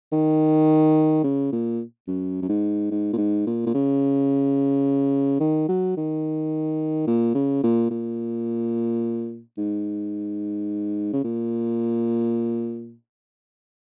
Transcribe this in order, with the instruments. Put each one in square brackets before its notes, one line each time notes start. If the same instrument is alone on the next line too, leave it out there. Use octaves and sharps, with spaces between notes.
[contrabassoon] D#3
C#3
A#2
F#2
F#2
G#2
G#2
A#2
G#2
A#2
A#2
C#3
D#3
F#3
D#3
A#2
C#3
A#2
A#2
G#2
C#3
A#2